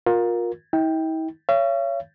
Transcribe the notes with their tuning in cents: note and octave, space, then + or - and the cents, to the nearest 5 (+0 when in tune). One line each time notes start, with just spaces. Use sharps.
F4 +30 A#4 +10
E4 -45 G5 +5
C#5 +10 F5 -45